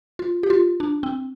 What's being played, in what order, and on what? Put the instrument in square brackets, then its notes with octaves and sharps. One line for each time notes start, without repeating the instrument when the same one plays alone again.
[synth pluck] F4
G4
F4
D4
C4